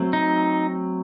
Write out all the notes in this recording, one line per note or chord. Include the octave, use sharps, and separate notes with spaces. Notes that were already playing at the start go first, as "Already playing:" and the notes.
Already playing: F#3 A3 C4
D#4